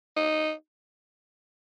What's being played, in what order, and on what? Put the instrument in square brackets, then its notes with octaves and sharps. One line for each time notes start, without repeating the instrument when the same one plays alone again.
[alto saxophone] D#4